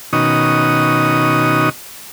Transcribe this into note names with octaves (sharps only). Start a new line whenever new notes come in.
B2 D#3 C#4 D#4 F#4 D#6